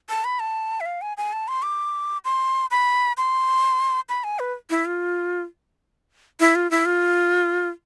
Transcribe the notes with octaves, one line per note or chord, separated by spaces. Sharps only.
A5
B5
A5
E5
F5
G#5
G#5
A5
C6
D6
C6
B5
C6
B5
G#5
B4
E4
F4
E4
F4
E4
F4